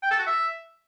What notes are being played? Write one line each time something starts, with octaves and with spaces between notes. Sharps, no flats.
G5
A4
F#4
E5